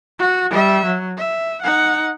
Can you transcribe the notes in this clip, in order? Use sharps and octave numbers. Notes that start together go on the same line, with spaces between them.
F#4
G3 E5
F#3
E5
D#4 F#5